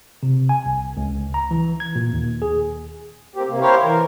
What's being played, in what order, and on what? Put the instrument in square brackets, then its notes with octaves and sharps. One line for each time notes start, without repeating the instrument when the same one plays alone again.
[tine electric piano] C3
G#5
C2
C#2
A#5
E3
G#6
A#2
D#2
G#4
[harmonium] A#3 C4 G4
C3 A#3
E4 G4 A#4 C5 C#5 F5
E3 A#4